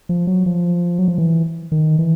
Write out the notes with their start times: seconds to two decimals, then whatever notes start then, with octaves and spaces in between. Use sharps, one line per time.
0.09 F3
0.27 F#3
0.46 F3
0.98 F#3
1.08 F3
1.18 E3
1.72 D#3
1.99 E3